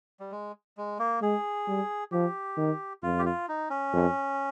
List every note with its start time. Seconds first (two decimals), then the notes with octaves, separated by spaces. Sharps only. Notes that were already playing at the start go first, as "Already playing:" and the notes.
0.20 G3
0.32 G#3
0.77 G#3
0.99 A#3
1.22 G#3 G#4
1.68 G3
2.12 F3 G4
2.58 D#3
3.03 F2 F4
3.19 G4
3.26 F4
3.48 D#4
3.70 C#4
3.93 F2